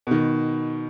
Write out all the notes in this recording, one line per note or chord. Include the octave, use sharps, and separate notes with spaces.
B2 D#3